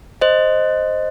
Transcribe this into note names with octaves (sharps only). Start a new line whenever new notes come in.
C5 D#5